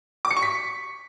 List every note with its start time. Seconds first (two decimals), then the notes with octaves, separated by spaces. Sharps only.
0.25 D6
0.31 C#7
0.37 C#6
0.42 B6